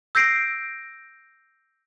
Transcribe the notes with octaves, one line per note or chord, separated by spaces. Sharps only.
E6 G6 A#6 C7 D7